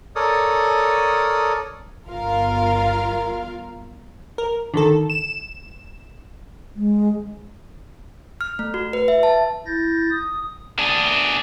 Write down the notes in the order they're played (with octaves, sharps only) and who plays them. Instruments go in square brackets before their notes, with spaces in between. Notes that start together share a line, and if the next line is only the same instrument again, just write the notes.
[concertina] A4 A#4 C#5 D5 D#6
[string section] G1 F4 A#4 F5
[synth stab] A#4
D3 D#3 A4
E7
[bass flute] G#3
[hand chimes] F6
A3
F#4
B4
E5
A5
[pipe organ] E4 G6 A6 A#6
D#6
[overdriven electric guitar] D4 G#4